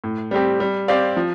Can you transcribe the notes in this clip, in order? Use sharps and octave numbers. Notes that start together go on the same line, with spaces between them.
A2
G3 C4 G4
G3
C4 G4 D5 F5
F3